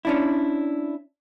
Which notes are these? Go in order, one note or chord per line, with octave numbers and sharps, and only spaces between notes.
C#4 D4 E4